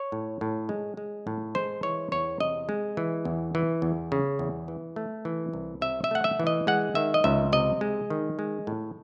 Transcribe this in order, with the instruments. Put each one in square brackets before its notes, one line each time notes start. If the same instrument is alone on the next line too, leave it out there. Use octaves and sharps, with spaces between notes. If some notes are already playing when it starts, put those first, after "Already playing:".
Already playing: [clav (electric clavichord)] C#5
A2
A2
G#3
G#3
A2
G#3 C5
E3 C#5
E2 C#5
C3 D#5
G#3
E3
E2
E3
E2
C#3
E2
E3
A3
E3
C2
C3 E5
E5
A3 F#5
E5
E3
D#5
G#3 F#5
D#3 E5
D#5
C#2 E5
C3 D#5
G#3
D#3
G#3
A2